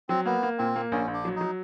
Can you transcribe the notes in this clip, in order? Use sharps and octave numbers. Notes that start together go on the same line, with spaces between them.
F#3 C4
A#3 B3
A#3
A#2 C4
A#3
A#1 C#4
A#1
D4
F#3
D#4
F#3